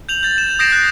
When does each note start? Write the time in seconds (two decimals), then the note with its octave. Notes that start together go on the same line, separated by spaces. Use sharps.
0.09 G6 F7 F#7
0.23 G6 A6 F7
0.38 E7
0.59 D#6 G6 A#6 C7 D7 E7
0.72 F#6 C7